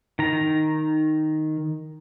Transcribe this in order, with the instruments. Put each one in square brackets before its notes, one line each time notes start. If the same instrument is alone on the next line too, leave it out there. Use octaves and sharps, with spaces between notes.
[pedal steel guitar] D#3 A#5